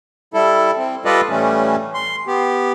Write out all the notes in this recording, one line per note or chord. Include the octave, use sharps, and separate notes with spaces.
G3 E4 A4
C4
G3 F4 A4 B4 D5 D#5
A2 E3 G3 A3 C#4
C6
B3 G4